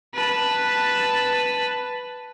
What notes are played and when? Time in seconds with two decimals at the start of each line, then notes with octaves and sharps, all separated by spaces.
0.15 B4 A5